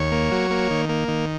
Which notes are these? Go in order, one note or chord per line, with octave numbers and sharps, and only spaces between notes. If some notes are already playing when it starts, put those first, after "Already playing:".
Already playing: D#2 C#5
A#3
F#3
A#3
D#3
A#3
D#3